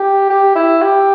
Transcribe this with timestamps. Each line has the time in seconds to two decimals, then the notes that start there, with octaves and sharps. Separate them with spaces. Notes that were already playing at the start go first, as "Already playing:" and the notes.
Already playing: G4
0.30 G4
0.56 E4
0.82 G4